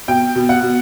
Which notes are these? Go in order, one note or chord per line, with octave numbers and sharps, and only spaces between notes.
B2 G5
B2
F#5
B2